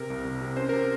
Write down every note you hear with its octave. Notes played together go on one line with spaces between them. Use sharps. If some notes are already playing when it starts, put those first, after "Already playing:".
Already playing: C3 A#4
C2
C2
C3
C#4 C5
C3 A#4